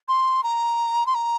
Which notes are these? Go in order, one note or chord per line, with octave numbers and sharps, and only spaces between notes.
C6
A#5
C6
A#5